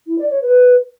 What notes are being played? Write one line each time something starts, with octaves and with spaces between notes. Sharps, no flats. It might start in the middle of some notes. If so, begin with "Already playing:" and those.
E4
D5
C#5
B4